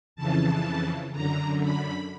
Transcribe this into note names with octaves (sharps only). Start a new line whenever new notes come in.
F2 C#3 E3 A5
F#2 D3 A#5
B5